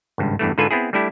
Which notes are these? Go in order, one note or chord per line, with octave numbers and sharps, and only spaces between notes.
G#1 C#2 G2
E2 G2 E3 A3
G#2 D3 F4 A4 B4 G#5
B3 C4 E4 G#4
G3 A3 D4 E4 G4